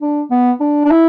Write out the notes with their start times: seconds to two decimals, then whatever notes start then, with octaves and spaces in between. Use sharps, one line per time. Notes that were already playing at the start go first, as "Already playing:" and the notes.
0.01 D4
0.31 B3
0.60 D4
0.85 D4
0.91 E4